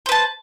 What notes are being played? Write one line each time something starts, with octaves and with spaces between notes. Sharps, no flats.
B4 C5 A5